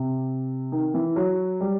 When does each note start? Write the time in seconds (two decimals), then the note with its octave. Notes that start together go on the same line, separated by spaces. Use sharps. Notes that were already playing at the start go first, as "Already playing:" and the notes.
Already playing: C3
0.72 D#3
0.94 E3
1.16 F#3
1.61 G3